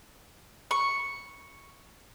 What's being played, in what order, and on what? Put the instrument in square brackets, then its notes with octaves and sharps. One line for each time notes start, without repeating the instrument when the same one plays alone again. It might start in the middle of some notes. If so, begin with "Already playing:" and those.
[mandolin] C#6